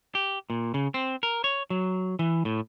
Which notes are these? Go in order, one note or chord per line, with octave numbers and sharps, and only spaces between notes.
G4
A#2
C#3
C4
A#4
C#5
F#3
E3
A2